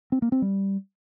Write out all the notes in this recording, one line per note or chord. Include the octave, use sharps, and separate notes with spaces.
C4
A#3
C4
G3